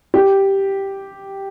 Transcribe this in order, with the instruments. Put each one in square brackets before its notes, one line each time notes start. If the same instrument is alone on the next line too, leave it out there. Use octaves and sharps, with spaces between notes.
[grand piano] G4